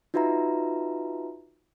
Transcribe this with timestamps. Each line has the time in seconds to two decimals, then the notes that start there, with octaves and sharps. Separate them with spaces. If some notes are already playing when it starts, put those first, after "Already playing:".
0.14 D#4 F4 F#4 B4 E5 A#5